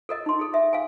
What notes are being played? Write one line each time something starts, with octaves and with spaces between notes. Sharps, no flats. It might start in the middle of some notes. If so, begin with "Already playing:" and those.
A4 A#4 D#5
D#4 C6
G#4 A4
E5
F5 G#5